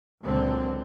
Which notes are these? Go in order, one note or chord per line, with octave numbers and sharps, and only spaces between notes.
C#2 A#2 D3 F#3 C4